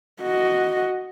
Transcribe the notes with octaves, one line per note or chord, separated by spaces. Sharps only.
F#4 D#5